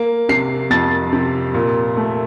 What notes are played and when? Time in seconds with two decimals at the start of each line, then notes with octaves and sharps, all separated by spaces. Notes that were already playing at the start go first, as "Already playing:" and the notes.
Already playing: A#3
0.29 C3 C7
0.70 F2 A6
1.13 C3
1.54 A#2
1.97 A3